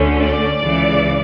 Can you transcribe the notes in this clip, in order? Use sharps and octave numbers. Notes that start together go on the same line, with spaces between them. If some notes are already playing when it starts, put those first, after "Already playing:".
Already playing: D2 D3 A3 C#4
D5
C#2 C#3 E3